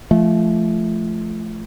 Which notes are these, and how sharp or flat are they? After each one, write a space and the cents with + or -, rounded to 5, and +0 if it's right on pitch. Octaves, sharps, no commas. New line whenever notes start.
F3 -30 A3 -20